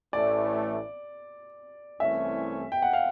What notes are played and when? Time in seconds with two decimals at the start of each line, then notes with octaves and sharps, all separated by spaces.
0.13 A1 A2 E3 A3 D5
2.00 C2 C3 E3 A3 C#4 E5
2.72 G5
2.82 F#5
2.93 F5